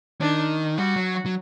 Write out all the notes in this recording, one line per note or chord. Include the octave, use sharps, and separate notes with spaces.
D#3 D4
G3 F#4
F#3
F#3